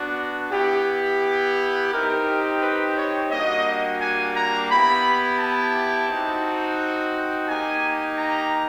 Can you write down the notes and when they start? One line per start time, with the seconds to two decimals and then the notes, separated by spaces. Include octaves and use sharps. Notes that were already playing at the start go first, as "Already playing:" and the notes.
Already playing: B3 D4 F#4
0.52 B3 E4 G4
1.91 C4 D#4 G4 A#4
2.61 B4
2.96 C#5
3.30 G3 A#3 D4 F#4 D#5
4.00 G#5
4.35 A#5
4.69 B3 E4 G4 B5
5.39 A5
6.08 C4 D#4 F#4
7.47 A#3 D#4 G4 G#5
8.17 A#5